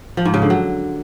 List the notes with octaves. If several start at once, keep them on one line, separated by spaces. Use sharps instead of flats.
F3
G#2
C#3
D3
F#3